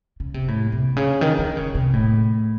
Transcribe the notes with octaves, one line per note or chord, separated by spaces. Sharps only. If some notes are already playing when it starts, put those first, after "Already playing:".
C#3
C3
A2
C3
C#3
D#3
D#3
C#3
C3
A2